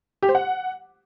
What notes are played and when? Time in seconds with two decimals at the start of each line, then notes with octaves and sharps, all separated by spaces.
0.23 G4
0.29 C5
0.35 F#5